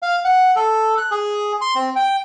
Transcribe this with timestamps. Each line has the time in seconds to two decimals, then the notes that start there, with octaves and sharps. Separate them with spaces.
0.03 F5
0.25 F#5
0.56 A4
0.97 F#6
1.11 G#4
1.61 C6
1.75 C4
1.96 G5